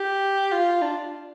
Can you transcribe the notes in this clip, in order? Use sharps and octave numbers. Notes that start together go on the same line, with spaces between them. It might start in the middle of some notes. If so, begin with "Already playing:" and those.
Already playing: G4
F4
D4